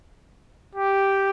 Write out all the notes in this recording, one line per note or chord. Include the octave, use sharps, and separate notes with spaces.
G4